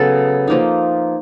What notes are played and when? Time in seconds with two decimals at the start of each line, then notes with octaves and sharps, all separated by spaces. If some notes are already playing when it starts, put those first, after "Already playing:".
Already playing: C#3 F#3 B3 A4 B4
0.48 F3 A#3 D#4